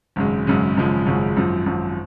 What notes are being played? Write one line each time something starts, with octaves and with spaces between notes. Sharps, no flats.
G#1 F#2 C#3 G#3
G#1 F#2 C#3 G#3
G#1 F#2 C#3 F3 G#3
G#1 F#2 C#3 F3 G#3
G#1 F#2 F3
G#1 F#2 F3